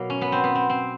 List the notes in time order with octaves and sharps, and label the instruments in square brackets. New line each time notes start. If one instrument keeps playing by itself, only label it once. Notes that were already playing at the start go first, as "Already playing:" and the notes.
Already playing: [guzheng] B2 F#3 A#3
C#4
B3
C4
B3
C4
C4